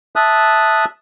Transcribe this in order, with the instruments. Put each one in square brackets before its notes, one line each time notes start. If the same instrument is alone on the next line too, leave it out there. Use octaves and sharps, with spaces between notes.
[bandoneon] E5 A5 D#6 F#6